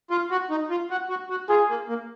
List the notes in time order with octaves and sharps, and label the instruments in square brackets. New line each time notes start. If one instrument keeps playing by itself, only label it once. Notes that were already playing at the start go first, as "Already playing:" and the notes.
[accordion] F4
F#4
D#4
F4
F#4
F#4
F#4
[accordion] F4 [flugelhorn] G#4
[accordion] A#3
A#3